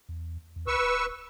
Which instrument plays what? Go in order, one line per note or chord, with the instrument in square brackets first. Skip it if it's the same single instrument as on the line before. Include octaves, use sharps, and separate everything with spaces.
[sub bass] E2
E2
[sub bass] C#2 [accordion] B4 C#6 E6
[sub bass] D1